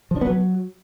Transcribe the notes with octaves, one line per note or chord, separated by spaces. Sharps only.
F3
D4
B3
F#3